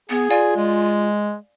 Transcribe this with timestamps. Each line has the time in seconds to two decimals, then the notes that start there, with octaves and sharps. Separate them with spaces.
0.10 B3 G#4
0.30 F4 D5 F5 G#5
0.56 G#3